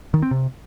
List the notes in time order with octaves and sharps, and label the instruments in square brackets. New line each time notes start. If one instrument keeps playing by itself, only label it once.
[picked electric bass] D#3
C4
C3